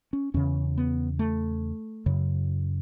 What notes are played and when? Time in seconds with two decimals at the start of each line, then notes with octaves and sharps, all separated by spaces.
0.13 C#4
0.34 E2 C#3 C#4
0.78 B3
1.19 A3
2.06 F#2 C#3